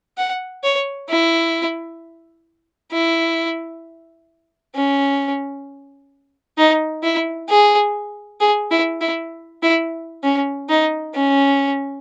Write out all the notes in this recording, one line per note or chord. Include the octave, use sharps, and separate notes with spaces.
F#5
C#5
E4
E4
C#4
D#4
E4
G#4
G#4
E4
E4
E4
C#4
D#4
C#4